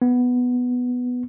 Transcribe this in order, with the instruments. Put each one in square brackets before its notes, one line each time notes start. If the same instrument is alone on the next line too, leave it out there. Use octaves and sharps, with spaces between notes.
[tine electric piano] B3